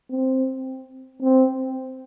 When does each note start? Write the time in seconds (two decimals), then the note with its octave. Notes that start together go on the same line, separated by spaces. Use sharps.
0.11 C4
1.22 C4